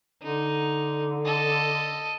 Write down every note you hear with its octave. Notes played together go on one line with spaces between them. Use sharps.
D3 D#4
A4 D#5